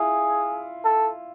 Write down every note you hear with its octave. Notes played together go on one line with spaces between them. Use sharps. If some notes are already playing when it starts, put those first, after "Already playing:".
Already playing: E4 F4 G#4
A4